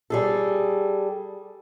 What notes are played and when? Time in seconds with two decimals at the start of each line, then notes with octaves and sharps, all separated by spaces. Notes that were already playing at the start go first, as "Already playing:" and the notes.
0.10 G3 G#4 A4